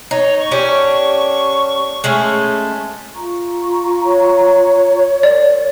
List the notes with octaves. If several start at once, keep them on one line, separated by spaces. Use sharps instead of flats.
D#4 C#5
C#6
C#4 D4 G4
G#3 A3 C#4
F4 A#5 C#6
C#5
A#4 D5